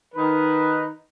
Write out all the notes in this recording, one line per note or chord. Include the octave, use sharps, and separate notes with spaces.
D#3 D#4 B4